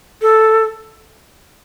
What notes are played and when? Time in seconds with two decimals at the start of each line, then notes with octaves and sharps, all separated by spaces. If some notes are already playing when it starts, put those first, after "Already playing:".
0.22 A4